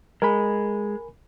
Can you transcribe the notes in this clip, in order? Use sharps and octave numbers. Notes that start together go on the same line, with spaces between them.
G#3 A#4 G#5 B5